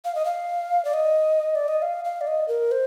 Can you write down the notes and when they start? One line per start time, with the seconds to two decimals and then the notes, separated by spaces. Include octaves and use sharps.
0.05 F5
0.15 D#5
0.25 F5
0.85 D5
0.94 D#5
1.55 D5
1.68 D#5
1.82 F5
2.05 F5
2.21 D5
2.27 D#5
2.48 A#4
2.72 C5